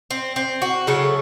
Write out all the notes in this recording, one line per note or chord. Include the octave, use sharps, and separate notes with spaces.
C4
C4
F#4
C#3 F#3 A3 A4